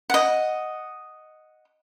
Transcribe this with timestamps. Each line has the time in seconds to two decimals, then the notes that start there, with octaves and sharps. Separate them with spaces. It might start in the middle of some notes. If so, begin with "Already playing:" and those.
0.10 D#5 F#5